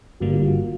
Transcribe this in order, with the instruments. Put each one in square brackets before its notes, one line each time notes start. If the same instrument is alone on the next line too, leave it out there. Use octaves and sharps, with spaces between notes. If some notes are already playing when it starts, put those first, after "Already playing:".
[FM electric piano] G1 G2 D3 G3 A#3 [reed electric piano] F#4
[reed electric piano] F4
F#4